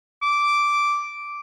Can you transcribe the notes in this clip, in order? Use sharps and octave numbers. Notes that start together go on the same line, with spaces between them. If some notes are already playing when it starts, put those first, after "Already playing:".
D6